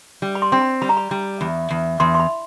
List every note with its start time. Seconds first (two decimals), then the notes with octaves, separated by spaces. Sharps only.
0.22 G3
0.35 B5
0.42 C6
0.52 C4 C6
0.61 B5
0.82 G3 B5
0.89 A#5
0.97 B5
1.11 G3
1.41 E2
1.70 E2
2.00 E2 C6
2.14 C6
2.20 B5